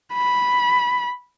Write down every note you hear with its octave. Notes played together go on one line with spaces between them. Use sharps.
B5